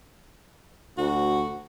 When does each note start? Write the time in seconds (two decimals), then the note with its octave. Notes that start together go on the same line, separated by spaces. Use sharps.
0.98 D2 F#4